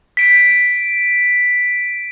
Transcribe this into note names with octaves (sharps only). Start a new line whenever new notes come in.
B6 D7